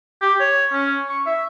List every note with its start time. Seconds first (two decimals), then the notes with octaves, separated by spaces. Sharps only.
0.22 G4
0.40 C#5
0.73 C#4
1.09 C#6
1.26 E5